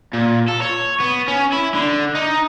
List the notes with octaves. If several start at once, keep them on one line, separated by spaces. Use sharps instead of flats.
A#2
A4
C#5
B3
C#4
E4
D3
D#4